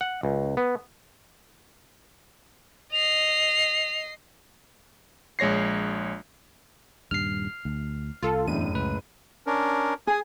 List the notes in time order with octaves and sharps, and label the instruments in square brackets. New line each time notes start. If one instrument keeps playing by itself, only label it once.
[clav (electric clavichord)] F#5
C#2
B3
[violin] D#5 C7 [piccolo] F7
[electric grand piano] A#1 G#3 C#5 A#6 C7
[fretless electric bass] D#1 G2 [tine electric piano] F6 C7
[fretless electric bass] D2
[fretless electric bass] C2 [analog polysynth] F4 A4
[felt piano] F#1 A2 [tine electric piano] E2 [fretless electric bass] D4 [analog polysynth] D#7
[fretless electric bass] C#2 [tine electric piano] B4
[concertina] C#4 D4 A#4
[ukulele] G#4 [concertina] G#5 D#6